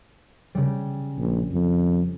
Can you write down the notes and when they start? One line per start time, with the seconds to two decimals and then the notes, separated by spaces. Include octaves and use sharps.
0.55 C#3 G3
1.17 A#1
1.52 F2